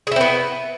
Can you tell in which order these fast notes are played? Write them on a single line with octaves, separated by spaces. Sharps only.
G#4 E4 C4 B3